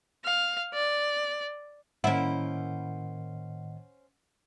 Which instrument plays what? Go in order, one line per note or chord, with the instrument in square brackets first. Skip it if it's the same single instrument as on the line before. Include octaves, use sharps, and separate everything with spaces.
[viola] F5
D5
[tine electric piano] A2 D#3 D#5 [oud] A#3 E4 [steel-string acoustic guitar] C#4 C5 [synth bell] F#5